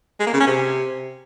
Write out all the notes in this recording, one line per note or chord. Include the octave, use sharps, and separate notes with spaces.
G#3
A#3
C#3
C#4
C3